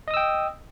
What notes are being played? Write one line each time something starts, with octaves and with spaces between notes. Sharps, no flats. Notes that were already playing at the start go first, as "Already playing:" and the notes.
D#5 G5 D#6 E6